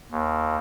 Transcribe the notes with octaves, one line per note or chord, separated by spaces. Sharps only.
D#2